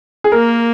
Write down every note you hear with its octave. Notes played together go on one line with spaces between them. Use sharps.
G#4
A#3 A#4